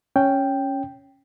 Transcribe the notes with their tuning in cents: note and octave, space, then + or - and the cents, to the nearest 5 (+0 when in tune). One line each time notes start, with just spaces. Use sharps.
C#4 +0 G5 +0